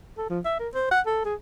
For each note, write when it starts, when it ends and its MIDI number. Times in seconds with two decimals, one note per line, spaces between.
0.18 0.29 69
0.30 0.40 53
0.45 0.59 76
0.60 0.68 70
0.74 0.90 72
0.91 1.00 78
1.06 1.20 69
1.25 1.35 68